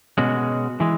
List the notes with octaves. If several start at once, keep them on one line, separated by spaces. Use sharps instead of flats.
B2 G#3 C#4 F#4
E3 G#3